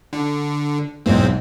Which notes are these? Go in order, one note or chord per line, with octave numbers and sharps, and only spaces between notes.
D3
B1 E2 G#2 C4